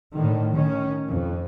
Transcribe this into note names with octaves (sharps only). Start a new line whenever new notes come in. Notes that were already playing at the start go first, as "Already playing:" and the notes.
A2 D3 D#3
D#3 C#4
F2